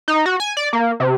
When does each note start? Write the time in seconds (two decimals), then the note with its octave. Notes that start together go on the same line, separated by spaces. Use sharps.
0.08 D#4
0.26 F#4
0.40 G#5
0.57 D5
0.73 A#3
1.00 C3